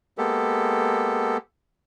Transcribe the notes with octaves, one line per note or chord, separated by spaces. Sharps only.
G#3 A#3 B3 G4 A4